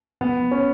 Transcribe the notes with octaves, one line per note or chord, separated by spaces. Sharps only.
B3
C#4